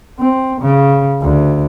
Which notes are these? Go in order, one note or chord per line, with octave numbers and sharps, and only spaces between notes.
C4
C#3
D2